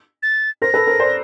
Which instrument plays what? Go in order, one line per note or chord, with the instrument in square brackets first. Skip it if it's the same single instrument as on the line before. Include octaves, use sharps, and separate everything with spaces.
[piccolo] A6
[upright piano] A#4 C5 [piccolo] A#6
[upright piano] A4 B4
A#4 C5
C5 D5